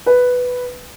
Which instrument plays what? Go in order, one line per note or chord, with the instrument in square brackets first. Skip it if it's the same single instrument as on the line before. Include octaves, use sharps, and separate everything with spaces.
[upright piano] B4